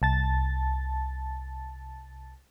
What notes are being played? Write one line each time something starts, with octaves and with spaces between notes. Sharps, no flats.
C2 A5 A6